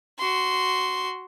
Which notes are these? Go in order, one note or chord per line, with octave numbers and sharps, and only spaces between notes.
F#4 C6